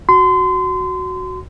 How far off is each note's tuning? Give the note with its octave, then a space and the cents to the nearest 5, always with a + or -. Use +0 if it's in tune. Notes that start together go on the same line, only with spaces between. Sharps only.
F#4 +0 C6 -30